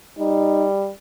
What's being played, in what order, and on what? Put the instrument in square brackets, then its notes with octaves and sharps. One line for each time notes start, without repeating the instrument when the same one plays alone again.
[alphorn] G3 [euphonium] D#4